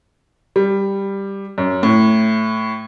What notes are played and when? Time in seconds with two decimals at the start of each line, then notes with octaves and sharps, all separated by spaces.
0.56 G3
1.58 F#2
1.83 A2